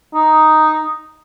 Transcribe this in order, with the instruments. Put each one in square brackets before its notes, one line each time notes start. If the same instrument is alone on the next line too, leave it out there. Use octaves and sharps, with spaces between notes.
[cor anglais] D#4